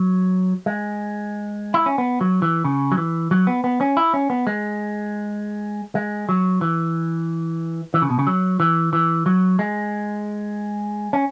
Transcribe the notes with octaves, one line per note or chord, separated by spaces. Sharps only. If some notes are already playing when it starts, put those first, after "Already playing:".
Already playing: F#3
G#3
E4
C#4
B3
F#3
E3
C#3
F#3
E3
F#3
B3
B3
C#4
E4
C#4
B3
G#3
G#3
F#3
E3
E3
C#3
B2
C#3
F#3
E3
E3
F#3
G#3
C#4